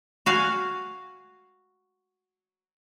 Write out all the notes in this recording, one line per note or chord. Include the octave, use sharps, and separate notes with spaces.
F#4 F5 G#5